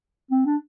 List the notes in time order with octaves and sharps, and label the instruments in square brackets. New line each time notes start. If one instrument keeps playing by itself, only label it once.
[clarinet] C4
D4